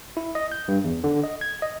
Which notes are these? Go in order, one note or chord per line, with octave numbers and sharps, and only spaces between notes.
E4
D#5
G6
G2
E2
D3
D#5
G#6
D#5